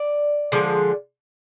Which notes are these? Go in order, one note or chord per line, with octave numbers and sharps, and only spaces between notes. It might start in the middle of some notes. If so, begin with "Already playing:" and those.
Already playing: D5
D3 F3 G#3